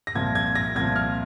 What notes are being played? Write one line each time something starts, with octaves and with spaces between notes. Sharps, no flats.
A#6
C2 A#2 F3 G#6
G#6
A#6
C2 A#2 F3 G#6
F6